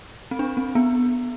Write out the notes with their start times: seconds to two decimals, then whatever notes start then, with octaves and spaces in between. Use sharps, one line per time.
0.31 C4
0.39 D4
0.57 C4
0.75 B3